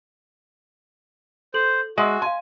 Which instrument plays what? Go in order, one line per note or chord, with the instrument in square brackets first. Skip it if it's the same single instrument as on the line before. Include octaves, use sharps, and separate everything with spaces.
[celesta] A4 F#7 [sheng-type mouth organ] C5
[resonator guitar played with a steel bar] G#3 [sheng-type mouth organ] F#4 [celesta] E5 C6 E6
[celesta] F5 C6 [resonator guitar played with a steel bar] G#5